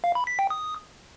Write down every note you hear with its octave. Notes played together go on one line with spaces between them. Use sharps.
F5
B5
B6
G5
D#6